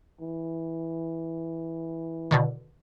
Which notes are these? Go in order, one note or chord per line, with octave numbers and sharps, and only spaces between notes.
E3
B2 D3 D#3